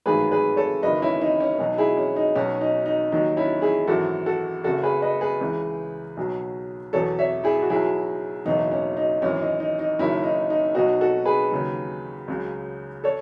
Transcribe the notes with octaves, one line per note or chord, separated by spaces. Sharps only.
A1 G#2 D#3 F#3 G#4 B4
G#4 B4
A4 C#5
F#1 F#2 D#3 B4 D#5
C#4 E4
D#4
C#4
B1 B2 F#3 D#4
E4 G#4
C#4
D#4
B1 B2 F#3 C#4
D#4
D#4
D#2 D#3 F#3 D#4
C#4 E4
E4 G#4
G#1 F#2 E3 F#4 A4
F#4 A4
F#1 F#2 C#3 F#4 A4
G#4 B4
B4 D#5
G#4 B4
C#2 C#3 E3
B1 B2 F#3
E2 B2 F#3 A4 C#5
C#5 E5
E4 G#4
F#4
B1 B2 F#3 E4 G#4
F#1 E2 B2 F#3 D#4
C#4
D#4
G#1 F#2 E3 C#4
D#4
D#4
D#4
F#1 F#2 D#3 F#3 C#4 E4
D#4
D#4
B1 B2 F#3 D#4 F#4
F#4 A4
G#4 B4
D#2 C#3 F#3
C#2 C#3 F#3
A4 C#5